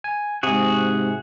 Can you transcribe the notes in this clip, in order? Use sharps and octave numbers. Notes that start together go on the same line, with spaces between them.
G#5
G#2 C3 F#4 G#4